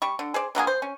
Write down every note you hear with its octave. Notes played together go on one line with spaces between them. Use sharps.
G3 C#6
D3
G#4 C5 D5
D3 F#3 A#3 G#4
C5
C#4